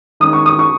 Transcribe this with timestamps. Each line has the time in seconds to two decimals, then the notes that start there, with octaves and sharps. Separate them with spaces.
0.20 D#3 G#3 C#4 D#6
0.33 C#6
0.46 D#6
0.59 C#6